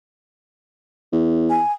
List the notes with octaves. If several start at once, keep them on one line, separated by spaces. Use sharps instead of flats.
E2
G#5